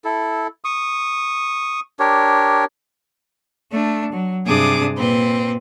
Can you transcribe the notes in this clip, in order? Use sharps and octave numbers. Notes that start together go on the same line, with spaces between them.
E4 A4
C#6 D#6
D4 G4 A#4 C#5
A3 D4
F#3
G2 C3 D4 G#4 D6 D#6
A#2 C4 B4